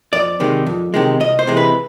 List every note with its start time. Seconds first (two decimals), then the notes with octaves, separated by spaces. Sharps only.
0.13 F2 D5
0.40 C3 D#3 G#3
0.66 F2
0.94 C3 D#3 G#3
1.20 C2 D#5
1.39 C5
1.47 C3 E3 G#3
1.57 B4